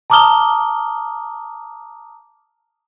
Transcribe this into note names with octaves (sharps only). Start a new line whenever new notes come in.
A5 A#5 D6 D#6 F6 G7